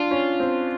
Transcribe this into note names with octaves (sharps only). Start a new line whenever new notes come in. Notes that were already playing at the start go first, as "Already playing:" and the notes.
Already playing: D4 F4
C#4
C4